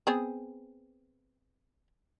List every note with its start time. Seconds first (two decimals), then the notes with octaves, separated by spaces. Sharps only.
0.07 B3 C4 G#4